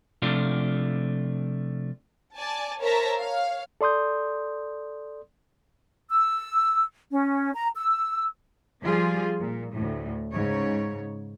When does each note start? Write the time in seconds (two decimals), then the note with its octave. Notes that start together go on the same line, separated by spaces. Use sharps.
0.22 C3 F3 A3 D4 F4
2.35 D5 G#5 A5
2.80 A#4 C5 C#5 E5 A5 A#5
3.18 C#5 F5
3.81 A4 D5 C6 D#6 G6
6.10 E6
7.11 C#4
7.55 A#5
7.76 E6
8.82 F3 G3 F4 G#4
9.39 A#2
9.74 D2 A2
10.32 G#2 C#3 C#5